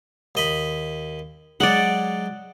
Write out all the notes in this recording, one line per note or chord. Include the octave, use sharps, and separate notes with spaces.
D#2 D#5 B5
F#3 G#3 D5 F#5